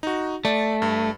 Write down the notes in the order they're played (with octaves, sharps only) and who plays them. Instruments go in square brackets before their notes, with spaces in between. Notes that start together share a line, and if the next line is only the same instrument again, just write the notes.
[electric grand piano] D#4 F#4
[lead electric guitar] A3 [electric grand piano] D5
[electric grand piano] G2